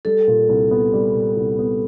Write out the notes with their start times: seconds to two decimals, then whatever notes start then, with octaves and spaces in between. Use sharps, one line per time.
0.05 G3 A4
0.28 A#2
0.49 C2
0.71 B3
0.93 G3
1.15 A#2
1.37 C2
1.59 B3